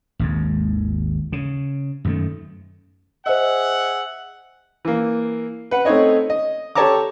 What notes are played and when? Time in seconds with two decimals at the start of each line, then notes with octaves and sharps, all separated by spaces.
0.19 G#1 D#2 G#2
1.32 C#3
2.05 F#2 D#3 A3
3.26 G#4 C5 D#5 E5 F#5
4.85 E3 A#3
5.71 B4 F#5
5.85 A3 C4 D#4 C#5 D#5
6.30 D#5
6.75 G4 A4 C#5 A5 A#5 D6